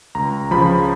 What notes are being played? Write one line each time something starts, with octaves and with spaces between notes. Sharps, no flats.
C#2 A#5
C#3 F3 B5